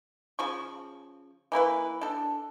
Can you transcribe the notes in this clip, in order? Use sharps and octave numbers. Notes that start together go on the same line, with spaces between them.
C#3 F3 C#6
E3 A#3 E4 B4
D4 A4